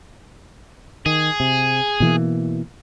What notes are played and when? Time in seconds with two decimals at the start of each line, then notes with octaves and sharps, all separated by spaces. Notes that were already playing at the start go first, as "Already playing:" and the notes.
1.06 D#3 G#4
1.40 C3
2.00 B2 E3 A#3